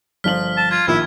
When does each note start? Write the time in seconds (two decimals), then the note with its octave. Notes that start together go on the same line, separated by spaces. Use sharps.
0.24 G1 F3 F6 B6 F#7
0.57 A5
0.71 F4 G#6
0.87 A#1 D#3 E4 F4